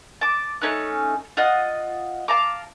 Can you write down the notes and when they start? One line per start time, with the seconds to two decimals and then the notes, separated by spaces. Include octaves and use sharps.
0.21 A5 D6
0.61 A3 C#4 D#4 F#6
1.37 F4 D#5 F#5
2.28 F5 A5 A#5 D6